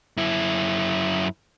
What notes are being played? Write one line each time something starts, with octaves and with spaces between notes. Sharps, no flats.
F#2 E4